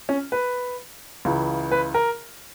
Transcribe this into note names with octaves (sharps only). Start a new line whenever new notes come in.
C#4
B4
C#2 C#3 E3
B4
A#4